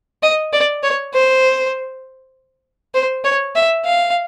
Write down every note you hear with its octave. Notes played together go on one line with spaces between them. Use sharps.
D#5
D5
C#5
C5
C5
C#5
E5
F5